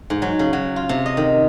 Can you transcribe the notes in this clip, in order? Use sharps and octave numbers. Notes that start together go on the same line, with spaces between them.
G#2
F#3
C#3
F#3
F4
C3
D#5
D#3